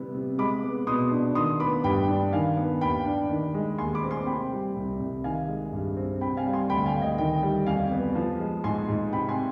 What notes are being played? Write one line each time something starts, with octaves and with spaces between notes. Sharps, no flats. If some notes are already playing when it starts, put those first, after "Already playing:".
Already playing: C3 G3 B3
C3
G#3 B5 D6
B3
B2 C6 D#6
D4
D#3 C6 D#6
B3 B5 D6
G2 G5 B5
D4
D#3 F5 G#5
B3
D#2 G5 B5
D4
D#3
G#3
D#2 G#5 C6
B5 D6
C4
G#5 C6
C3 G5 B5
G3
C2
C2
D#3 F5 G#5
G#3
G2
C4
C3 G5 B5
F5 G#5
G3
G#5 C6
D2 G5 B5
F5 G#5
D2
D#5 G5
D#3 D#5 G5
G3
F2 F5 G#5
B3
F3
G#3
G#2 G#5 C6
G#2
C3 G5 B5
G#5 C6